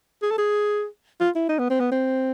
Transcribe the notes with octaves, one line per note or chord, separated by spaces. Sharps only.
G#4
A4
G#4
F4
E4
D#4
B3
C4
B3
C4